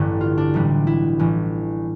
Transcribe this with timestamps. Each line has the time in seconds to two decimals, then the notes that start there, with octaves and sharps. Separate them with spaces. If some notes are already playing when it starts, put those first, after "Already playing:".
Already playing: A1 G2 D3 G3 G4 A4 B4 D5
0.21 F4
0.38 D4
0.54 B1 A2 E3 G3
0.87 E4
1.19 A1 A2 E3